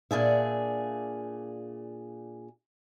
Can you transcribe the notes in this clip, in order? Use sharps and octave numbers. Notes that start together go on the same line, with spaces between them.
A#2 D4 G#4 E5